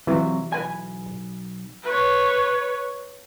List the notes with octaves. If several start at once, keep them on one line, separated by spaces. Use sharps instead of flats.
F2 C3 E3 F#3
B1 B4 G#5
B4 C#5